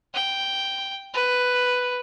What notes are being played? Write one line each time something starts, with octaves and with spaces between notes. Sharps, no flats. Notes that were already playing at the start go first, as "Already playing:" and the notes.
G5
B4